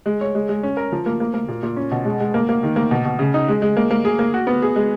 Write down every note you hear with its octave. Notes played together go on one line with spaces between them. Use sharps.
G#3
C#5
G#3
G#3
C#4
A#4
F3
A#3
A#3
A#3
A#2
A#2
C#4
B2
G#3
G#3
A#3
A#3
D#3
A#3
B2
B2
C#3
D#4
G#3
G#3
A#3
A#3
G#4
A#3
F#4
B3
G#4
G#3